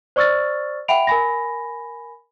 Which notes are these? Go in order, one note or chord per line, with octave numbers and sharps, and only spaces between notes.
C5 D5 C#6 E6 F6 A6
E5 F#5 G5 B5 D7 F7
A#4 G#5 B5 A#6